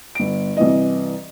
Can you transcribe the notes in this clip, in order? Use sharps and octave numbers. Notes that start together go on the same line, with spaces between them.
G1 D7
C2 E3 D#5